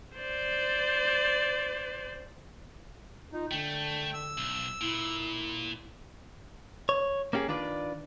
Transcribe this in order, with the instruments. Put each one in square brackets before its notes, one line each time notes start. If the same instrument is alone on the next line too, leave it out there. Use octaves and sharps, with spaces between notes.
[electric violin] C5 D5
[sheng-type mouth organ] D#4 [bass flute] F4
[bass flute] D3 [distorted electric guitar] A3 [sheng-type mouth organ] G5
[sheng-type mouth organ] E6
[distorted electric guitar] B1
[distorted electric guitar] A#2 [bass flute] E4
[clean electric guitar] C#5
A#3 C#4 F4 G4 G#4
D#3 D4 F4 B4 D5